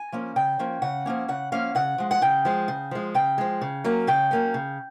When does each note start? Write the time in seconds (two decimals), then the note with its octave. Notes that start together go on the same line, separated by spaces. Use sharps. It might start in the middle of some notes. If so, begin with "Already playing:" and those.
Already playing: G#5
0.12 F3 A#3 C#4
0.36 C#3 G5
0.59 F3 A#3 C#4
0.82 C#3 F#5
1.06 F3 A#3 C#4
1.28 C#3 F#5
1.52 F3 A#3 C#4 F5
1.75 C#3 F#5
1.98 F3 G#3
2.11 F#5
2.22 C#3 G5
2.45 F3 G#3
2.68 C#3
2.91 F3 G#3
3.14 C#3 G5
3.38 F3 G#3
3.61 C#3
3.84 F#3 A#3 C#4
4.07 C#3 G5
4.31 F#3 A#3 C#4
4.54 C#3